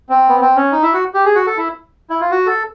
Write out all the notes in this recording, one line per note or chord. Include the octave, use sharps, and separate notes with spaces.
C4
B3
C4
C#4
D#4
E4
F#4
G4
G#4
F#4
A4
E4
E4
F4
F#4
A4